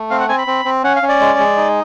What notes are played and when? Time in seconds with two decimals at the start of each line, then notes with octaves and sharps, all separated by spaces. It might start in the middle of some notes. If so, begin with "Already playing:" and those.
Already playing: A3
0.10 C4 F5
0.20 F#5
0.29 C4 G#5
0.38 B5
0.47 C4
0.65 C4
0.83 C#4 F#5
0.96 F5
1.02 C#4
1.09 D5
1.21 G#3
1.39 G#3
1.57 D#4